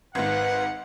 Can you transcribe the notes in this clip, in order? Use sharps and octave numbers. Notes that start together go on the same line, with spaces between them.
G#1 G#2 B4 F#5